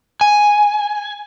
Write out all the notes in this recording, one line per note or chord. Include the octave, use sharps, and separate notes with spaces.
G#5